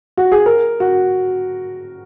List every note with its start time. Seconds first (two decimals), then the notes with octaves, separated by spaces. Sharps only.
0.17 F#4
0.32 G#4
0.46 A#4
0.80 F#4